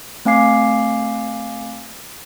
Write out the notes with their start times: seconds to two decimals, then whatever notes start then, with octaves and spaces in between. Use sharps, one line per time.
0.25 A3 C4 F5 G#5 D6 C7